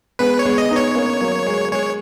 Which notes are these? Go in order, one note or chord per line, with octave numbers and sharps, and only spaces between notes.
G#3 B3 B4
C#5
G#3 B3
D#5
B3 D#4
C#5
A#3 C#4
F#3 A#3
G#3
G#3 C#5